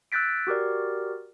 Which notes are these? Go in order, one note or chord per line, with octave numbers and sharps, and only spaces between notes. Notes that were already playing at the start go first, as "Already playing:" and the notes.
E6 F#6 G6 A6 B6 D7
F#4 G4 A#4 D5